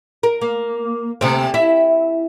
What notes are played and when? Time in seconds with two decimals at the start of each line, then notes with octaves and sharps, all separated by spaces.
0.23 A#4
0.42 A#3
1.21 D2 C3 A3 A#3 C4
1.54 E4 E5